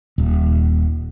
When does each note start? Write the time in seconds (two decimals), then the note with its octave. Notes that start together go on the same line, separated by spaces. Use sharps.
0.18 D#1